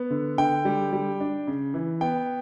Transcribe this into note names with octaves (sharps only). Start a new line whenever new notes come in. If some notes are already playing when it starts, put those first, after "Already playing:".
Already playing: B3
D3
D3 G5
G3
G3
D4
C#3
E3
B3 G5